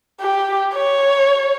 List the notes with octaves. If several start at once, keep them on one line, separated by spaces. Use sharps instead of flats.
G4
C#5